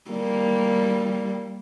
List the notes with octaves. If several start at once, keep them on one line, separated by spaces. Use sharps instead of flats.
G3 A#3